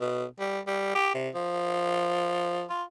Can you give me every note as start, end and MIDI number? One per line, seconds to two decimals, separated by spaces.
0.01 0.25 47
0.40 0.60 55
0.67 0.91 55
0.95 1.10 67
1.14 1.29 48
1.35 2.64 53
2.70 2.83 65